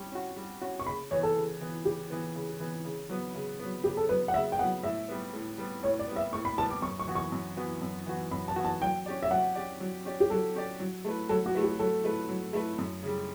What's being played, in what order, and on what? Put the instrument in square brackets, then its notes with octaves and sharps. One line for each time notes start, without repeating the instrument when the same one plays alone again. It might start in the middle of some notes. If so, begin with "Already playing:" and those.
Already playing: [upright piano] G3 C#4
C#4 F#4
G3
C#4 F#4
[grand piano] C#6
[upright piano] C#3 [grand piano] B5
[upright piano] E3 B3 [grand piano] C#5
[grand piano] A4
[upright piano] C#3
E3 B3
[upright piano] C#3 [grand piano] G4
[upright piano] E3 B3
C#3
E3 B3
C#3
F#3 B3
C#3
F#3 B3
[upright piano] C#3 [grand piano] G4
[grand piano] A4
[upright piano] F#3 B3 [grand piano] B4
[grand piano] F#5
[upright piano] C#3 [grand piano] E5
[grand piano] G5
[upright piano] B3 [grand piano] F#5
[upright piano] F#3
[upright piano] A2 [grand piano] E5
[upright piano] G3 B3
A2
G3 B3
[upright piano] A2 [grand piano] C#5
[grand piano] D5
[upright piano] G3 B3
[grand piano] E5
[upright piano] A2 [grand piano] C#6
[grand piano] B5
[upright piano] G3 B3 [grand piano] A5
[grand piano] D6
[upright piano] F#2 [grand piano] C#6
[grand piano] C#6
[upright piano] E3 B3 F#4
[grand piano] C#6
[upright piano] F#2
E3 B3 F#4
F#2
E3 B3 F#4
[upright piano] F#2 [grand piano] B5
[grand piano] A5
[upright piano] E3 B3 F#4
[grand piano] A5
[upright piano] F#3 [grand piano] G5
[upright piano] C#4 G4 D5
[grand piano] E5
[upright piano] F#3 [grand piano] F#5
[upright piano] C#4 G4 D5
F#3
C#4 G4 D5
[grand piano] G4
[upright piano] F#3 [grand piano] A4
[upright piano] C#4 G4 D5
F#3
A3 E4 B4
[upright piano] F#3 [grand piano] A4
[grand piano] F#4
[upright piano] A3 E4 B4
[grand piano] G4
[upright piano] F#3 [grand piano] A4
[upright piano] A3 E4 B4
F#3
A3 E4 B4
F#2
C#3 G3